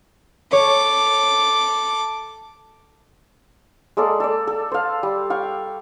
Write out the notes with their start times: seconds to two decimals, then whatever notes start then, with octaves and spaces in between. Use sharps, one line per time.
0.52 A4 C#5 D6
3.97 G#3 A#3 A4 D5
4.20 A4 D5
4.47 A4
4.72 C5 F5
5.03 G3
5.30 F5 G5 C#6